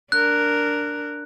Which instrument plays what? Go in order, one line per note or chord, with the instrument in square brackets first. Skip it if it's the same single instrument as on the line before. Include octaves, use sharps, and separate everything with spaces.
[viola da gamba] D4 A#4 [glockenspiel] F#6